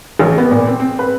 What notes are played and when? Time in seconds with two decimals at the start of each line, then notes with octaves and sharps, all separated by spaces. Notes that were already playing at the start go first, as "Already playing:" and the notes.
0.19 A1
0.38 B3
0.51 A#2
0.67 C4
0.80 C4
0.99 B4